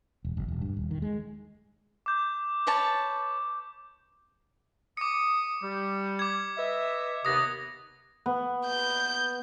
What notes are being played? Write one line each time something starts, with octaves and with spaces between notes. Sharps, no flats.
E1
F#1
E1
G2
D#1
D#3
G#3
D6 G6
B4 C#5 A5
D6 D#6 C#7
G3
D6 G#6
B4 D#5 E5
D#2 C3 B3 D#6 A#6
B3
G6